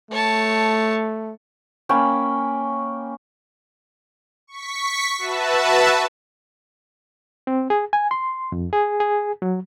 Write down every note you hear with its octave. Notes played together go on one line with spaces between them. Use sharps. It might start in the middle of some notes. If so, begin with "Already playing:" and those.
A3 C#5 A5
A#3 C#4 G5 B5
C#6 B6
F#4 B4 E5 A5
C4
G#4
G#5
C6
F2
G#4
G#4
F#3